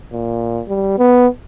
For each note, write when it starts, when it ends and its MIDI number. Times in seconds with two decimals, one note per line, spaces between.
0.13 0.62 46
0.68 0.97 55
0.98 1.27 59